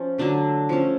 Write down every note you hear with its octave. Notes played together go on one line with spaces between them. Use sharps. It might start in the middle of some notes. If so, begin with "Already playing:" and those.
Already playing: F3 C#4
D3 F#3 A3 D4
F3 A3 C#4